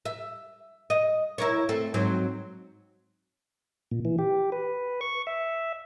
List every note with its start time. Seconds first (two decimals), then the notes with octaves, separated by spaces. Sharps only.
0.05 E5
0.90 D#5
1.38 E4 A#4 C#5
1.69 A3 C4
1.94 G#2 F#3 C4
3.91 A#2
4.05 E3
4.19 G4
4.52 B4
5.01 C#6
5.27 E5